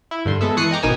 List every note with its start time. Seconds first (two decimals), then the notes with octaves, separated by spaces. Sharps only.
0.11 E4
0.25 G2 D3 C6
0.41 G#3 B3 A4 E5
0.57 E3 C#6 D#6 F#6 C7 C#7
0.71 D#5 G5 A#5 D6
0.82 G#1 B2 D#4 A#4 G#5 E6